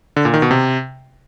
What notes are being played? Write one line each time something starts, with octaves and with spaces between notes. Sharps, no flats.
D3
A#2
D#3
B2
C3